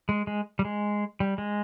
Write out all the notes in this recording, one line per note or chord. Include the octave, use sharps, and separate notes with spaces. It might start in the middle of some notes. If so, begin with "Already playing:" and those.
G#3
G#3
G3
G#3
G3
G#3